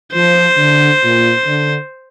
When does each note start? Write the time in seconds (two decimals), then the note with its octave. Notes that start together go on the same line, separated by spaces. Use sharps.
0.13 F3 C5
0.58 D3
1.01 A#2
1.44 D3